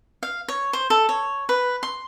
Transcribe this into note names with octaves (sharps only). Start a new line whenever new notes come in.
F5
C#5
C5
A4
C#5
B4
C6